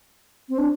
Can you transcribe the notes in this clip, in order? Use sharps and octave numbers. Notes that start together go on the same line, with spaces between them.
C4
D4